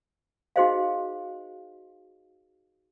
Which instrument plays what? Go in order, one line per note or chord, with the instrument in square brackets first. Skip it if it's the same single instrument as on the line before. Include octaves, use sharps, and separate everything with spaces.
[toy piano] D#4 F#4 G#4 C5 D#5 F5